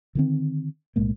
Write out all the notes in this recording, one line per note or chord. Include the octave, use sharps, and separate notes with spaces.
D3 D#3 C4
B1 A2 G#3 A#3